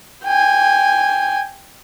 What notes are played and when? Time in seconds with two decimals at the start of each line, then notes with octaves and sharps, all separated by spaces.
0.25 G5 G#5